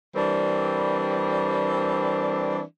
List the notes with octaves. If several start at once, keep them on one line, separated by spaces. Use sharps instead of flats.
E3 G3 C4 D4 A#4 D5